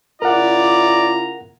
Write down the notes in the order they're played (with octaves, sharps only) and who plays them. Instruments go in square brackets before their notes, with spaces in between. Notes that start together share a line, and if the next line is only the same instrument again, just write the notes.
[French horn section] C#3 E4 F4 [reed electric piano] A#4 F#5 [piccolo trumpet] D5 [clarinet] A#5